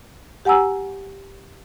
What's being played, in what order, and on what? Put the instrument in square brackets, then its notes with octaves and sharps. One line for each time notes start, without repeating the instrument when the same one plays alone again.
[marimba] G4 F#5 G#5 A#5 E6